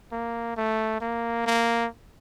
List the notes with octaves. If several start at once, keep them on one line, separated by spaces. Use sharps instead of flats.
A#3
A3
A#3
A#3